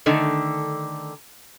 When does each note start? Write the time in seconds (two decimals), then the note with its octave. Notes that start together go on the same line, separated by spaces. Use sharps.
0.06 D3 D#3 A3